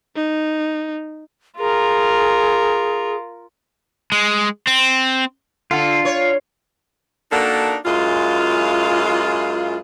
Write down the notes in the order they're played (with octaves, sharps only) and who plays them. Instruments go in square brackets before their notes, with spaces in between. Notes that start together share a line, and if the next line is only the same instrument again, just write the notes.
[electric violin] D#4
[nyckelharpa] F4 A#4 [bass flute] G#4
[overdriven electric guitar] G#3
C4
[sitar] D3 A4 [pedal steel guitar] F4
[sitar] C#5
[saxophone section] A#3 D4 D#4 F#4 A4 A#4
F#2 G#3 E4 F4